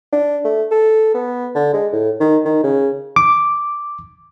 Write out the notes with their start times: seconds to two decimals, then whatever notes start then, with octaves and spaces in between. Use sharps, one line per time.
0.13 D4
0.45 A3
0.71 A4
1.15 B3
1.55 D3
1.74 G#3
1.93 A2
2.20 D#3
2.45 D#3
2.64 C#3
3.16 D6